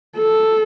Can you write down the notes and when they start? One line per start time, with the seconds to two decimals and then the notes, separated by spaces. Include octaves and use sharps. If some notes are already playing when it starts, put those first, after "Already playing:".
0.17 A4